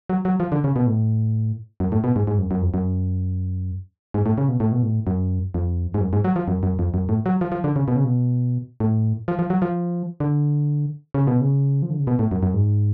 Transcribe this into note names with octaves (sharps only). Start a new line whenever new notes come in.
F#3
F#3
F3
D3
C#3
B2
A2
F#2
A2
B2
G#2
G#2
F#2
F#2
F2
F#2
G#2
A2
C#3
B2
A2
B2
A2
F#2
F2
G#2
F#2
G#2
F#3
F3
F#2
F#2
F2
F#2
A2
F#3
F3
F3
D3
C#3
B2
C#3
B2
A2
F3
F3
F#3
F3
D3
C#3
B2
C#3
F3
D3
C#3
B2
A2
F#2
F#2
G#2